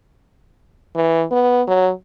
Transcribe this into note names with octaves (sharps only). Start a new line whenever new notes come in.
E3
B3
F#3